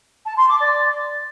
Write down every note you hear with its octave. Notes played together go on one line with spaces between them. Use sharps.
A5
C6
D6
D5